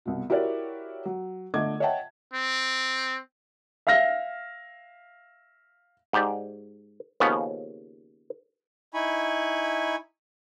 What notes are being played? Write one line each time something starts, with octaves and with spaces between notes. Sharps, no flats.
C2 B2
E4 F#4 G4 A#4 C#5 D5
F#3
D3 A3 D#5 D6 G#6
C#5 D#5 E5 F#5 G5 A5
C4
E5 F5 F6 A#6
G#2 G4 D5
D#2 C#3 F3 B3 C#4
D#4 E4 G#5 B5 C#6